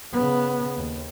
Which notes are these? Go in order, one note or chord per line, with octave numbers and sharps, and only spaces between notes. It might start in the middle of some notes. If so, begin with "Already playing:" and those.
C#3 B3
D#2